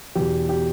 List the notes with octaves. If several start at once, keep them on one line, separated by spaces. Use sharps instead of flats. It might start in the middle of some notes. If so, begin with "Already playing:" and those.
E2 B2 G4
G4